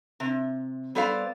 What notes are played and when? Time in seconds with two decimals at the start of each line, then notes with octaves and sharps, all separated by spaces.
0.20 C3
0.95 G3 B3 A4 C5 D5 F5